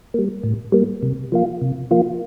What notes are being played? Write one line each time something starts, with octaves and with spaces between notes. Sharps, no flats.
G3 A#3
A2
G3 A#3
C3
F3 A#3 F4
C3
F3 A#3 F4